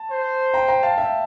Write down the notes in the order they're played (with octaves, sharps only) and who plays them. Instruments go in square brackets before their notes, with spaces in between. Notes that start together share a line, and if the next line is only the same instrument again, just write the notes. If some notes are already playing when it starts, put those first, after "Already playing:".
Already playing: [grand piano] A5
[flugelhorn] C5
[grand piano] G5 A#5
G5 A#5
F5 A5
E5 G5